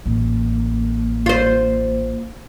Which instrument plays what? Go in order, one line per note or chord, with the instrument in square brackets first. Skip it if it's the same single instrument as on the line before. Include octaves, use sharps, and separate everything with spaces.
[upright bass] A1 [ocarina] A#3
[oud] F4 C5